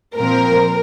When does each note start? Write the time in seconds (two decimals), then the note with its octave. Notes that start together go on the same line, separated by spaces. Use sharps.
0.17 A#2 F3 C4 A#4